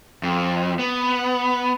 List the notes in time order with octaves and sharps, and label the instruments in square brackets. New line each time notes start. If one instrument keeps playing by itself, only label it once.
[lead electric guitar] F2
B3